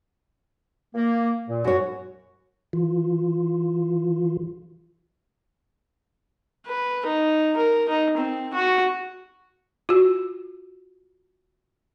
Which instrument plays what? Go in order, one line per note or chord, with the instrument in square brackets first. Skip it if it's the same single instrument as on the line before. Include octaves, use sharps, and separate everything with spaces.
[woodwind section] A#3
A#2
[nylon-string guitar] F#2 C#5 [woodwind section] F#4
[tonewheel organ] E3 F4
[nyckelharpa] B4
D#4
A#4
D#4
C4
F#4
[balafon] F4 F#4